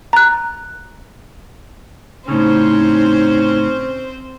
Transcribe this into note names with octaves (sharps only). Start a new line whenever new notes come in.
A#5 F#6
A2 C#3 C4 C#4 D#4 C5